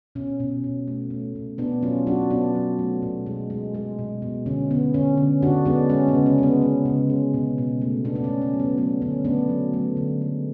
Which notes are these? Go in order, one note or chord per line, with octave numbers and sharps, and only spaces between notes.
B2 C#4
B2
B2
A3
A3
B2
B2 B3 D4
F#3 C#4 F4
F#3 D4 F#4
B2 B3 D4
F#3
A3
B2
G#3
G#3
G#3
B2
B2
D3 C#4
D3 B3
D3 C#4
D3
D3 D4 F#4
G#3 B3 D4
G#3 C#4
B3
C#3
C#4
G#3 B3
G#3
C#3
G#3
B2
B2
A3
B2 B3 D4
D4
A3 C#4
C#4
F#3
B3
A3 B3
D3 C#4
A3 B3 D4
F#3
A3
D3
G#3